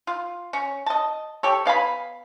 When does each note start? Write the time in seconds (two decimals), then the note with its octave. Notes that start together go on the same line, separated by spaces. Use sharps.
0.07 F4
0.53 C#4
0.86 D#5 A5
1.43 G4 A4 C#5
1.65 B3 F5 G#5 B5